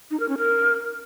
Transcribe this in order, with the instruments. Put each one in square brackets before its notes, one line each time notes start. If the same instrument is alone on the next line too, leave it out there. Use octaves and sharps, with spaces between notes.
[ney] D#4
A#4
C#4
A#4